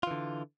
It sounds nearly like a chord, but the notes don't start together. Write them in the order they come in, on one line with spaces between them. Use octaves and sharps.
F4 E3 D3